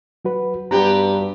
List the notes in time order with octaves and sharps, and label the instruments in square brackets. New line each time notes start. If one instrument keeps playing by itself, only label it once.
[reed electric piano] F#3 F#4 B4
[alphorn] G2 [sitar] B3 G4 [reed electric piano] F#4 A#5